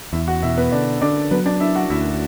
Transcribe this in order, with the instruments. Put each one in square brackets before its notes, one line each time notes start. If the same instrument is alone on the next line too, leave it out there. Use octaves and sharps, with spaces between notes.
[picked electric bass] E2 [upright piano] E4 E5
[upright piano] F#4 F#5
[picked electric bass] B2 [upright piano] E4 E5
[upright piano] B3 B4
[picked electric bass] D3 [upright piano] D4 D5
[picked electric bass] D3 [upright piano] D4 D5
[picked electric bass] F#3 [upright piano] B3 B4
[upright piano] D4 D5
[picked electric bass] D4 [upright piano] E4 E5
[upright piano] F#4 F#5
[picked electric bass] D2 [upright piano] E4 E5